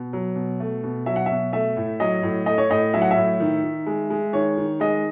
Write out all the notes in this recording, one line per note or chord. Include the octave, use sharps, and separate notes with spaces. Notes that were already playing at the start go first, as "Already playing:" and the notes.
Already playing: B2
F#3
B2
A3
B2
F#3 E5
F#5
B2 E5
A3 E5
A2
F#3 D#5
A2
A3 D#5
C#5
A2 D#5
F#3 E5
F#5
E5
A2
D#3
D#3
G#3
G#3
D#3 C#5
D#3
G#3 D#5